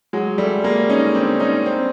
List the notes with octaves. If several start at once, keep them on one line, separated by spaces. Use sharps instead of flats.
F#3 G#3
G3 A3
G#3 A#3
C#4 D#4
C4 D4
C#4 D#4
C4 D4